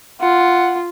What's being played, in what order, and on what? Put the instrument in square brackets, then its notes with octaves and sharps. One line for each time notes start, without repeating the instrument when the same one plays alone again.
[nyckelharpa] F4 [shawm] F#5